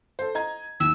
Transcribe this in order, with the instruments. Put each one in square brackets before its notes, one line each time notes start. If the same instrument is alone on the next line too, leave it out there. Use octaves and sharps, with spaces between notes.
[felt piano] A4 C5
D#5 A#5 G#6
[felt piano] D#2 [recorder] E6